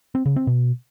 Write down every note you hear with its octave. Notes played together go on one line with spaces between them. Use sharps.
C4
C#3
C4
B2